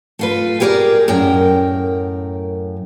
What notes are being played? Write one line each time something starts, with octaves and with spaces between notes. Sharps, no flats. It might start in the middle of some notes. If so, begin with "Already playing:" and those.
A3 F4 B4
G4 G#4 A#4 C5 D5
F#2 A2 A#4 G5